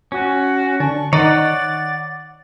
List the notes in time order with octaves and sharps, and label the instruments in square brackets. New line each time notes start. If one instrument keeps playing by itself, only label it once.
[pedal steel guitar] C#4 [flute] F#4
[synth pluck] D3 [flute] C#6
[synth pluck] D#3 [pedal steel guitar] C#5 D5 F#5 [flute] A6